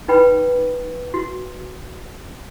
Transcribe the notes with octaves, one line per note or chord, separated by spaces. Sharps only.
D#4 B4 G5 B5
F#4